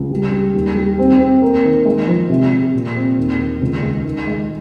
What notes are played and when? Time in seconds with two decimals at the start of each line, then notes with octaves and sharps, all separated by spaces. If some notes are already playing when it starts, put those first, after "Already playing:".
Already playing: C#2
0.11 G3
0.32 G3
0.54 D#2
0.76 G3
0.99 C4
1.20 C4
1.42 A#3
1.64 D#3
1.85 G#3
2.07 F3
2.29 C3
2.52 C3
2.74 A#2
2.96 C4
3.18 D#2
3.39 D#3
3.61 C#2
3.83 G#3
4.04 D#3
4.27 G#3